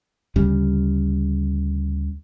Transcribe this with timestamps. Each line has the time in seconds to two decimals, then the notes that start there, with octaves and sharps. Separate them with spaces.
0.36 D2 C#3 G3